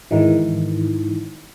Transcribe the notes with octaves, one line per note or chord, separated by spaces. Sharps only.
G#2 D#3 E3